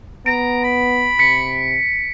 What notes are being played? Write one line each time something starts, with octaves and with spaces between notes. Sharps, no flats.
B3 A#5 D7
B5
C3 B6 C#7